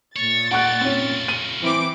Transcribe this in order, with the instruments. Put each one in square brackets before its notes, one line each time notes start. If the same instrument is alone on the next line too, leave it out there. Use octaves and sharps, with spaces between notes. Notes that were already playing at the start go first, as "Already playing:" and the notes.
[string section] A#2 A6 [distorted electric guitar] C#5
[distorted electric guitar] D#4 D5 [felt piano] F#5 C#6 F#6
[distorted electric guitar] A3 F4 [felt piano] C4 C#4
[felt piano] D#7
[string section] E3 C4 D6